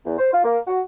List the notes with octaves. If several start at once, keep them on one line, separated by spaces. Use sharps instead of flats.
E2
C5
F4
A#3
F#4